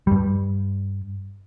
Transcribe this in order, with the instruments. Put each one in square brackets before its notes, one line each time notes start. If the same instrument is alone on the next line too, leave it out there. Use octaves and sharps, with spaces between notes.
[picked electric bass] G2 G3